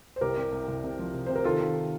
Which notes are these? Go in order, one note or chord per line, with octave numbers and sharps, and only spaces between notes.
C5
C2 G4 A#4
C3
C2
C2
C3
F3
C3
C3 C5
A#4
D#3 F4 A4
D#3